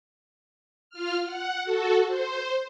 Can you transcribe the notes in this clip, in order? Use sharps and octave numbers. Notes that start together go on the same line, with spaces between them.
F4 F6
F#5
F#4 A4
C5